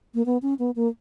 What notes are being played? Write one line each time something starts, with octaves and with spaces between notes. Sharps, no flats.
A#3
B3
C#4
B3
A#3